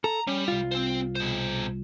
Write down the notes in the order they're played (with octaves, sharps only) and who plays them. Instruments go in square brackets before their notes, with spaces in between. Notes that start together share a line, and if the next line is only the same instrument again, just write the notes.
[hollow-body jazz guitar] A4 [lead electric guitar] A#5
[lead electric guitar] G3 [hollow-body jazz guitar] C#4
[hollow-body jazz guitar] C2 F4
[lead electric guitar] C4 C5
B2 C5